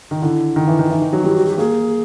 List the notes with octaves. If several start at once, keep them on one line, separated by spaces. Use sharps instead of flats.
D#3
D3 E4
D#3
E3
D#3
E4
E3 D#4
D#3
F#3
G3 E4
F#4
G4
A#3 G#4